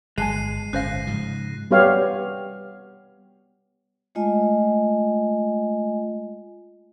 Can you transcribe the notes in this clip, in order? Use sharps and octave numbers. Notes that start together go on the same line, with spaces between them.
G1 G#3 G#5 A5 F#6 C7 D#7
G1 A2 C#4 C5 F5 F#6 A#6
G#2 C#3 F3
G3 B3 G4 C#5 F5
G#3 A3 F4 D#5 G#5